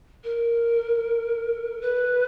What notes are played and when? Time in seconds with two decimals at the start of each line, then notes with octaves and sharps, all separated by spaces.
0.24 A#4
1.81 B4